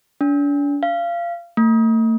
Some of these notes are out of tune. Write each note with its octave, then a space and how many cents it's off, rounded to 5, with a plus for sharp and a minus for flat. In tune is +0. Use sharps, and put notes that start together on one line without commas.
D4 -40
F5 -25
A3 +40